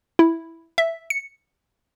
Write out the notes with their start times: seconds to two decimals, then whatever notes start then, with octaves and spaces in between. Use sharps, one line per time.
0.19 E4
0.78 E5
1.10 C#7